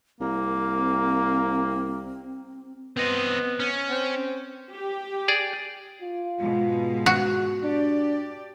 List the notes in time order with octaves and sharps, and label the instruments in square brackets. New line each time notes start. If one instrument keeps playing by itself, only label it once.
[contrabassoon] C2 [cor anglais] A#3 [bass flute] C4
[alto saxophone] B3 [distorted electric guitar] C4 D#5
[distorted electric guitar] C#4
[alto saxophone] C4
[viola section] G4
[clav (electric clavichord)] G#4 D5
[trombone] F4
[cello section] G#2 B2 G#3
[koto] F#4
[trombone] D4 [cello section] G4 D5